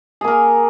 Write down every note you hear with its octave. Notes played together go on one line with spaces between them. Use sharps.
A#3 G#4 A#4